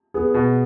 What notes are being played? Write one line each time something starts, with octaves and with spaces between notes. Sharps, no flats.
B3 G#4
B2